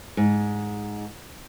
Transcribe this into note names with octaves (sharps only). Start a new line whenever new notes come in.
G#2